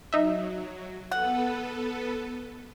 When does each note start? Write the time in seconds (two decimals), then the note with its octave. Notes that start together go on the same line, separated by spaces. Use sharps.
0.13 F#3 D#4 E5
1.11 B3 A4 B4 F#5